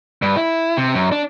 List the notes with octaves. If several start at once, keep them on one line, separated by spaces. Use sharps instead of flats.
G2
E4
C3
F#2
D4